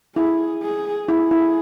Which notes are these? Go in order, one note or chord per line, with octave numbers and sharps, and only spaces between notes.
E4 G#4
G#4
E4 G#4
E4